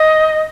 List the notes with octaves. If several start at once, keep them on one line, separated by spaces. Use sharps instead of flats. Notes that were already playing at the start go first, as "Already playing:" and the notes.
Already playing: D#5